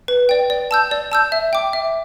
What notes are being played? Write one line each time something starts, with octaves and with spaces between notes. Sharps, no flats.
B4
D5 G5
D5
A5 E6 G6
D5
A5 E6 G6
E5
G5 D6
E5